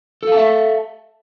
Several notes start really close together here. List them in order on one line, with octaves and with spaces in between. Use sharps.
A4 F5 A5 E5